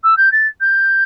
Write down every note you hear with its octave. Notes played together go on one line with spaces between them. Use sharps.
E6
G6
A6
G6